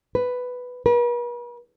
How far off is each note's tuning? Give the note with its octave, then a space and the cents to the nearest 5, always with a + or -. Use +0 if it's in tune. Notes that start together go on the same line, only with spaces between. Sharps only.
B4 +5
B4 -45